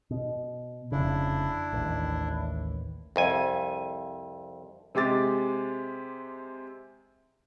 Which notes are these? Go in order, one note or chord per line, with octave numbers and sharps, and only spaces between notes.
B2
F1 C#3 D4 E4
A1 D#2
C2 F2 G#5
C3 G#3 G4 D6 A6